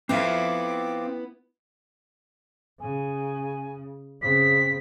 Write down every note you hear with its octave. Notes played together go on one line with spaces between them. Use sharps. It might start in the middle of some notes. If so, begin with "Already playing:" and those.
B3 C4 E4 F5 D6
C#3 G#5
C#3 C4 B6